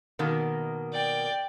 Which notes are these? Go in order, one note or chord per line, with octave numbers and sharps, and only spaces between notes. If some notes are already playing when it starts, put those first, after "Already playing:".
B2 D#3 A#3
D5 G5